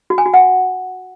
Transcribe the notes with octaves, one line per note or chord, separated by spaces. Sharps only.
F#4
G#5
F#4
F#5